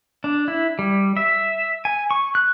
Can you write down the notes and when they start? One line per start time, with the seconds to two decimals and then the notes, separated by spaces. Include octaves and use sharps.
0.24 D4
0.48 E4
0.79 G3
1.17 E5
1.85 G#5
2.11 C#6
2.35 F#6